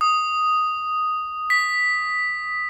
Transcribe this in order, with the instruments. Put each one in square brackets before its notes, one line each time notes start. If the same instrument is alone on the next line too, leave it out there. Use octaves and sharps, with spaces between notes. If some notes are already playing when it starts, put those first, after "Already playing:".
[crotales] D#6
B6